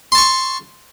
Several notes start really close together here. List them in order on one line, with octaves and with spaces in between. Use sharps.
C6 A5 C#6